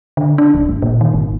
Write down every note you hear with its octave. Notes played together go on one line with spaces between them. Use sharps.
D3
D4
D1
G#1
A#2
D#3
G#1